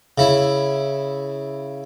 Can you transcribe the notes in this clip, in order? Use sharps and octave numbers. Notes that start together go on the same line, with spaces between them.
C#3 E4